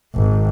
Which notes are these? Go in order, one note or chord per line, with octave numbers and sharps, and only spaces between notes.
G#1